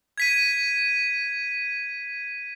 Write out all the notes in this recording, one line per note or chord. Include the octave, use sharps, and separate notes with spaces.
G#6 B6 D#7